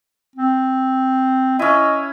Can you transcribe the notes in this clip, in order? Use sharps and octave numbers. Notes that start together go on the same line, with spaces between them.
C4
C#4 E4 D#5